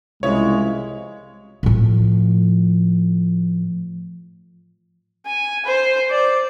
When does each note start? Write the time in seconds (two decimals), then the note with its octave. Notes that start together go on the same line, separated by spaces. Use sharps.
0.23 C2 F2 C#3 G#3 E4 C#5
1.63 A2 F3
5.26 G#5
5.65 C5
6.10 D5